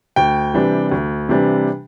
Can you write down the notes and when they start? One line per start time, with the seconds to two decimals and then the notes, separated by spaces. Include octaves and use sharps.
0.16 D2 G5
0.54 C3 E3 G3 D4
0.91 D2
1.29 C3 E3 G3 D4